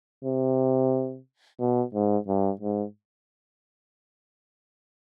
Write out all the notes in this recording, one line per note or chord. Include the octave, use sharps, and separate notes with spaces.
C3
B2
G#2
G2
G#2